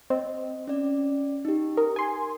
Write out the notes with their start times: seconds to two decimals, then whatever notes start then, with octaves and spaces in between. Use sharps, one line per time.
0.10 C4 D#5
0.68 C#4 D5
1.45 D#4 G4
1.77 A#4 D#6
1.96 G#5 C6